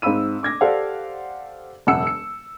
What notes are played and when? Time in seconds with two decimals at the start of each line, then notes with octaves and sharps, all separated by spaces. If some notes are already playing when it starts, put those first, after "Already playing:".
0.02 G#2 C4 F5 B5 E6 D#7
0.43 D6 G#6 A#6
0.61 G4 A4 C5 D5 F5 F#5
1.87 E1 F#2 C#3 F#5 E6 C#7
2.07 C#7